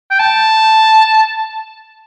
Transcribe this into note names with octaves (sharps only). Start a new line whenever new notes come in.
G5
A5